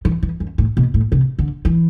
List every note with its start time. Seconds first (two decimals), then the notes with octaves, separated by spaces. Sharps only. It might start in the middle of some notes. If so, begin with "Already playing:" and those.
0.05 E3
0.23 E3
0.40 F#2
0.58 A2
0.77 B2
0.94 A2
1.12 C3
1.39 D3
1.65 E3